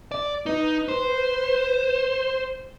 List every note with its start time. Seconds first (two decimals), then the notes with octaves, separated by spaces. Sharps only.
0.12 D5
0.46 D#4 B4
0.88 C5